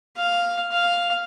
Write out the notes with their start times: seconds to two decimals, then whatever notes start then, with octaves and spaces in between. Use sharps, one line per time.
0.17 F5
0.72 F5